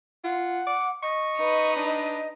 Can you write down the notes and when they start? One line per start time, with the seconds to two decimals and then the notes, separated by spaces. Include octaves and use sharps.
0.24 F4 F#5
0.67 D6
1.02 D#5 C#6
1.37 D#4 B4
1.76 D4